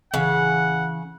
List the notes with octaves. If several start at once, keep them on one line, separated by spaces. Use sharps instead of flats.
D1 C#3 E3 F#5